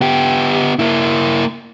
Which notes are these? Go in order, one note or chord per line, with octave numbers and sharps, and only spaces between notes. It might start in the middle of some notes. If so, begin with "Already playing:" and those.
B3 G4
A#3 E4